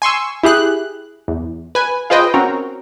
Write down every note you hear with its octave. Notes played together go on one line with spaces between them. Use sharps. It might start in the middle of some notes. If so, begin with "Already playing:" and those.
G#5 C6 C#6 E6
E4 G4 G#4 F#6
E2
B4 G#5
F4 G#4 B4 C5 D#5 G5
C4 C#4 F#4 A#4